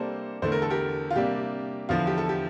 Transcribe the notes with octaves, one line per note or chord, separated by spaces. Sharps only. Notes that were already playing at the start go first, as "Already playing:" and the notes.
Already playing: C3 G3 A#3 D4 A4 C5
E2 D3 A3 C5
A#4
A4
G4 A#4
F4
C3 G3 A#3 D4 G4
E2 D3 F3 F4
G4
A4
G4